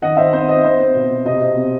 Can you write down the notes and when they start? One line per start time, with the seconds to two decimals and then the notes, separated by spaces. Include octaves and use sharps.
0.02 D#3 D#5 F#5
0.17 D#3 C5 E5
0.33 C4 C5
0.48 C4 D#5
0.64 C4 C5
0.79 C4
0.95 B2
1.11 B2
1.25 C3 D#5
1.42 C4
1.57 C4